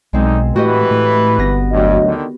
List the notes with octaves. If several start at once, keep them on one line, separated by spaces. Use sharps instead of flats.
B1 D3 G#3 C4 D#4
A2 E3 F#4 G4 B4 D#5
A2
G1 B3 A#6
D2 G2 F#3 D#5
D3 D#3